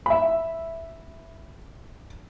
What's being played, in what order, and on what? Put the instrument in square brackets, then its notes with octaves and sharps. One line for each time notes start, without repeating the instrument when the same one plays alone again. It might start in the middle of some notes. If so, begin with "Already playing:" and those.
[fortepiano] E5 B5